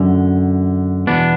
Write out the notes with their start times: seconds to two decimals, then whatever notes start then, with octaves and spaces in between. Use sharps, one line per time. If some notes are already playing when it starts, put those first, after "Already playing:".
Already playing: F#2 D3
1.07 E2 B2 B3 D4